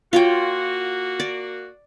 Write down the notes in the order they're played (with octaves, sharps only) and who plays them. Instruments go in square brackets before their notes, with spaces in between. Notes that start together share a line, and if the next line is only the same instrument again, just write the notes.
[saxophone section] A#3 F#4 [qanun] F4 C#5 G5
[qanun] D5